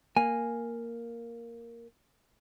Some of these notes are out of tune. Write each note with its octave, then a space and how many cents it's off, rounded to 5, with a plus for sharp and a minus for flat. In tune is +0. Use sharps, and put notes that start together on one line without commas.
A#3 +0 G#5 -5